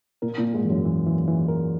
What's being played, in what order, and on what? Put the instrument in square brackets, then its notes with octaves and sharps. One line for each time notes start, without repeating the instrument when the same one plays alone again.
[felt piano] A#2 [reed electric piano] A#4
[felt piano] A#2
[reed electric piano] A#3
[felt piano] G#2
[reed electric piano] E3
[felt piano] F#2
[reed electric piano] E3
E3
E3
A#4